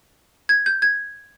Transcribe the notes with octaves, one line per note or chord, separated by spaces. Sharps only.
G#6
G6
G#6